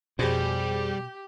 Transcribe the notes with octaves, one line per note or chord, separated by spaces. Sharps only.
F2 B2 G3 G4 G#4 C5